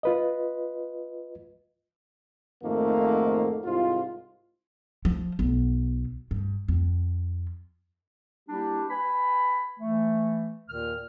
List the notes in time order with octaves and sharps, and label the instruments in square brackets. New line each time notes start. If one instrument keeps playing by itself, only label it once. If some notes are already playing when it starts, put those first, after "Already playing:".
[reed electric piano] F4 B4 D#5
[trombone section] F2 G#2 D#3 A3 A#3
C2 G#2 F4
[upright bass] F3
B1
G2
F2
[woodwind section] G3 A#3 D4 E4 G4
B4 G#5 B5
E3 A3
D#2 A#2 D#3 F6